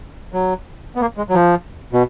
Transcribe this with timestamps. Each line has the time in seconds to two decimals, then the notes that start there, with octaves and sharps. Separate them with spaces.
0.33 F#3
0.95 B3
1.01 A#3
1.17 G#3
1.29 F#3
1.34 F3
1.93 B2